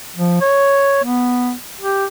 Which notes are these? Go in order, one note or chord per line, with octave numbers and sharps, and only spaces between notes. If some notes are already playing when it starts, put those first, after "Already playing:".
F3
C#5
B3
G4